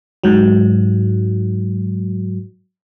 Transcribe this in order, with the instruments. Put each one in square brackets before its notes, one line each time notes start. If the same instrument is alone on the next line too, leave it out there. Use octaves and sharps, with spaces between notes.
[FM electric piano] G#2 F#3